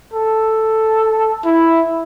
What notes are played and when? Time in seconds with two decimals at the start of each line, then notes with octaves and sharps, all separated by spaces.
0.13 A4
1.45 E4